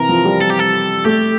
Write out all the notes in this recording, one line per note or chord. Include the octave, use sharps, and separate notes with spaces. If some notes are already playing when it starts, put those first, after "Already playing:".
Already playing: C3 E3 A#4
F3
G3
A4
G4
A4
A3 G4